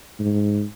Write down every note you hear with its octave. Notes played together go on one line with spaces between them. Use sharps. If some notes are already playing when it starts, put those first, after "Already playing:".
G#2